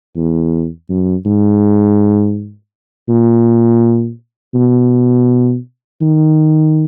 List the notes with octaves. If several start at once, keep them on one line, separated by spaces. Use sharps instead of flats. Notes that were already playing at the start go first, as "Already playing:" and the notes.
E2
F#2
G#2
A#2
B2
D#3